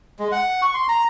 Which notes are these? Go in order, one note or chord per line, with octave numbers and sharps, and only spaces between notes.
G#3
F#5
C#6
C6
A#5